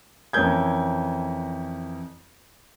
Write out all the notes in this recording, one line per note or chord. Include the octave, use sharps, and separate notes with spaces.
F2 E3 C#4 A#4 G6 G#6